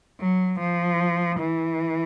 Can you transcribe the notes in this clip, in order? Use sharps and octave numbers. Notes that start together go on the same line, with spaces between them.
F#3
F3
E3